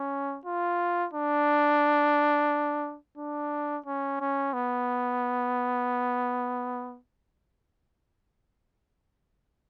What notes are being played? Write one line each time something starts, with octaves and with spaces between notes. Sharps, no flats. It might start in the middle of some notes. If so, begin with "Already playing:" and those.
Already playing: C#4
F4
D4
D4
C#4
C#4
B3